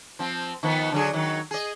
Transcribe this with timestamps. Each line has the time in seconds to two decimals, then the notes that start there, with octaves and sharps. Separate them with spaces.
0.19 F3 C4
0.63 D#3 F3 B3
0.92 D3 F#3 G#4
1.13 D#3 F#3
1.51 G#4 D#5